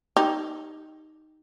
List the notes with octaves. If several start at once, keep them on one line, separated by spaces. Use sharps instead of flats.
D#4 G4